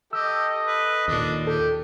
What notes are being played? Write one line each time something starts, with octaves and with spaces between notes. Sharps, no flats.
G4 A4 D#5 E6
B4
D#2 A#2 D4
G4 A4